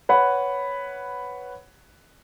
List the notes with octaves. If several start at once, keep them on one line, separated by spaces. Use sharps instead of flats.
B4 C#5 F#5 B5